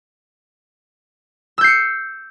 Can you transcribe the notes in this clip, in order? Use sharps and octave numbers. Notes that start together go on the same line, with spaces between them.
E6 G6 C7 C#7